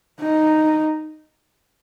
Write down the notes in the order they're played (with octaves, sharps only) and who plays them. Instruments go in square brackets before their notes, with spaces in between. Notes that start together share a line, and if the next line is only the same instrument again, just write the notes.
[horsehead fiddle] D#4